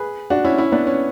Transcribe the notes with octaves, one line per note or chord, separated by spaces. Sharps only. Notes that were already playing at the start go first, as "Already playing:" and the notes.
Already playing: G#4 B4
D4 F#4
C#4 E4
C#4 E4
B3 D4
C#4